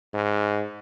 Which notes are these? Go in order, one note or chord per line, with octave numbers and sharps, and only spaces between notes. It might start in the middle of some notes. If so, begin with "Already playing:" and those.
G#2